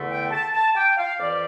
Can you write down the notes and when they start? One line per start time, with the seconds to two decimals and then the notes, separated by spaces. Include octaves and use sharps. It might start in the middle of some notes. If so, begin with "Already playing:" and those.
Already playing: E2 D3 A3
0.09 G5
0.31 A5
0.53 A5
0.75 G5
0.97 F5
1.20 F2 E3 G3 D5